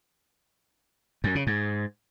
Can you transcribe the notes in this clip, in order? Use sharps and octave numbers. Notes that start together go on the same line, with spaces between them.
F#2
C#3
G#2